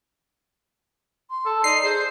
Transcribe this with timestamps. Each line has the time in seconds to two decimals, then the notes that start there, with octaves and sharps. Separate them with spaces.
1.30 C6
1.46 A4
1.64 D#4 D5 C7
1.83 G#4 C5